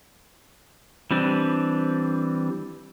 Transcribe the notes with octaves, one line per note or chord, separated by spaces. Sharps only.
E3 G3 C4 D4